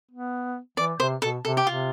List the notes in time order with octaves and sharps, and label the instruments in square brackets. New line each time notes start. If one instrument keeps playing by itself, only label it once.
[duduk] B3
[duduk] E3 [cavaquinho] D5
[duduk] C3 [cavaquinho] C5
[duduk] B2 [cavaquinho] A4
[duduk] C3 [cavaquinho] A4
[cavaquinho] G4
[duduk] C3 [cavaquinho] F4